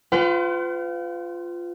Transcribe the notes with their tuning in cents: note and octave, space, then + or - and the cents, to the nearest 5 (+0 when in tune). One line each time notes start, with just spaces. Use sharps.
F4 +0 B4 +40 G5 -45